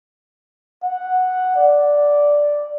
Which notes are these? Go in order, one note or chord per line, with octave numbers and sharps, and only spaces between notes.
F#5
D5